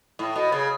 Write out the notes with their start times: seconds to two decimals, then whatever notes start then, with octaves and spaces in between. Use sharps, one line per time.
0.19 A2
0.36 B2
0.52 C#3